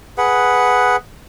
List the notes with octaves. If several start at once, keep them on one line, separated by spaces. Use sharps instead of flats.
G#4 B4 F#5